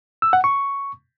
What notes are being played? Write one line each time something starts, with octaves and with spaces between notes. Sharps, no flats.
E6
F#5
C#6